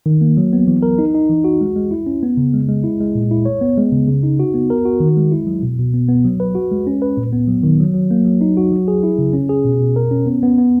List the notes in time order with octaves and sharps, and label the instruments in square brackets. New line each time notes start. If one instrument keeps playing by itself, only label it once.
[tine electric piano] D#3
A#3
F#3
B3
E3
A#4
D#4
D#4
E3
F#4
G#3
G#3
E4
C#4
B3
C#3
G#3
G#3
E4
G#3
A#2
E4
C#5
B3
G#3
C#3
C#3
D#4
F#4
B3
A#4
F#4
D#3
G#3
E4
F#3
B2
B2
B3
B3
F#3
B4
F#4
G#3
C#4
B4
A#2
B3
F#3
D#3
F#3
F#3
A#3
F#3
D#4
F#4
F#3
G#4
E4
C#3
C#4
G#4
B2
B2
A#4
C#4
B3
B3
B3